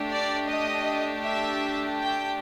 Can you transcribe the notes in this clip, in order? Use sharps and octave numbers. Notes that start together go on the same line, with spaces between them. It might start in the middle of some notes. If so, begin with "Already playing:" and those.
Already playing: A3 D4 G4
D5
D#5
E5
G5